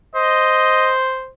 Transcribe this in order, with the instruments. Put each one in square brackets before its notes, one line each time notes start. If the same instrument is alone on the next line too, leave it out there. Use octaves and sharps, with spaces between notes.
[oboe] C5 [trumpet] D#5